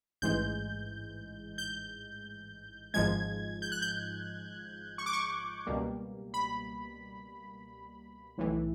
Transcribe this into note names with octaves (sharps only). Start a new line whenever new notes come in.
A1 G#2 E3 G#3 G6
G6
G#1 G#2 F3 G#3 G#6
G6
F#6
G6
C#6
D6
C#6
C#2 B2 G3 A#3
B5
B1 A2 E3